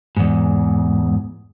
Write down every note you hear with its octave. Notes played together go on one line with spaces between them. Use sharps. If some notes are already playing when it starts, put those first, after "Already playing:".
E2 G#2